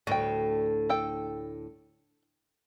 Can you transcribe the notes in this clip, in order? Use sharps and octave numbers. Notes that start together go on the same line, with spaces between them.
D2 A2 F#4 G5
A4 G5